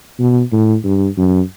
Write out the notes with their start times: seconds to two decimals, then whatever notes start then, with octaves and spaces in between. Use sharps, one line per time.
0.19 B2
0.53 A2
0.85 G2
1.18 F#2